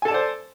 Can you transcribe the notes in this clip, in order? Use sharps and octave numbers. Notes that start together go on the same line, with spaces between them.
A4 C5 D5 G#5 A5